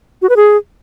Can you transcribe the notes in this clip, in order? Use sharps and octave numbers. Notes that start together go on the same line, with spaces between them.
F#4
B4
G#4